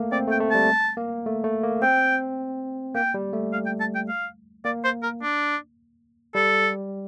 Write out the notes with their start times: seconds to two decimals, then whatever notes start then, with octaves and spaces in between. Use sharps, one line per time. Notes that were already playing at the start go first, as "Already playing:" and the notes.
Already playing: A3 A#3
0.12 C4 D5
0.27 A3
0.31 G5
0.40 A3
0.51 G3 A5
0.97 A#3
1.26 A3
1.44 A3
1.63 A#3
1.82 C4 G5
2.95 A#3 G5
3.14 G3
3.33 A3
3.53 F5
3.66 G5
3.80 A5
3.95 G5
4.09 F5
4.65 A#3 D5
4.84 C5
5.03 A#4
5.22 D4
6.35 G3 A4